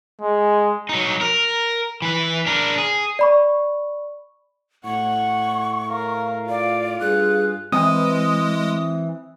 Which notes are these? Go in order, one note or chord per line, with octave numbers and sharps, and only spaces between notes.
G#3
F#3 D#4
A#4
E3 B4
D4 A#4
G#4
D5 B5 C#6
A2 F#5 C#6
A#4 F5
F4 D5
G2 G#4 F#6
E3 G#3 C4 D#6